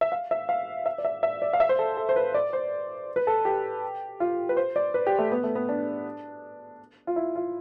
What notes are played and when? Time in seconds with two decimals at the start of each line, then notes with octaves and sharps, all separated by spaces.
0.01 E5
0.12 F5
0.31 E5
0.49 F5
0.86 E5
0.98 D5
1.05 E5
1.23 E5
1.42 D5
1.53 F5
1.60 E5
1.69 C5
1.79 A4
1.97 A4
2.09 C5
2.16 B4
2.34 D5
2.53 C5
3.16 B4
3.27 A4
3.45 G4
4.20 F4
4.49 B4
4.57 C5
4.76 D5
4.94 B4
5.07 G4
5.19 A3
5.32 B3
5.43 A3
5.55 B3
5.69 D4
7.07 F4
7.16 E4
7.36 F4